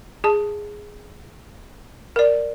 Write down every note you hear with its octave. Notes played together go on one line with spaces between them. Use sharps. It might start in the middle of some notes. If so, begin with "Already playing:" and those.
G#4 A5
A#4 D5